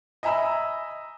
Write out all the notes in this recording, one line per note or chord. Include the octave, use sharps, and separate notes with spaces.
D#5 E5 G#5 A#5 B5 E6